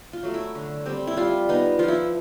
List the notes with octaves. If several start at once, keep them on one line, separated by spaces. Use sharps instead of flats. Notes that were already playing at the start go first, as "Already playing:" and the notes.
F4
F#3 A3
E4
D3
G3 C4
E4
G3 F4
B3 D#4
F3 F4
E4